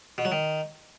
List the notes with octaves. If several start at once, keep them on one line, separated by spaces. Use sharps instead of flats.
B2
F#3
D#3